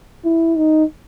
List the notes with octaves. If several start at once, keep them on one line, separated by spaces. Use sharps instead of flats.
E4
D#4